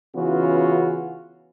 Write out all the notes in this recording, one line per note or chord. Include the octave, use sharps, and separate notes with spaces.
C#3 E3 B3 C#4 F4 F#4